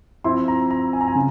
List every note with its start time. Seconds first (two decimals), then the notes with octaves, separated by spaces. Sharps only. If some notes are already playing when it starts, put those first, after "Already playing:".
0.24 F3 C4 E4 C6
0.48 A#5
0.71 A#5
0.93 G#5
1.01 A#5
1.08 G#5
1.15 C#3